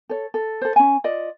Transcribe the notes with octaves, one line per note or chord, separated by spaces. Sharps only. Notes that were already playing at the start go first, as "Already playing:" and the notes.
A4 C#5
A4
A4 C5
C#4 G#5
F4 D5 D#5